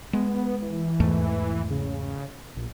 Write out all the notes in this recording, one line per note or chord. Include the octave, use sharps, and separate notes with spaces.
G#3 B3
E3
E2 G#2 A3
C#3
A#1